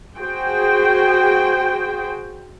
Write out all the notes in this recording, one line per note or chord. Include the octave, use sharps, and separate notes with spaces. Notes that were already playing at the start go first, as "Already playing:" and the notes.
F#4 G#4 C5 G5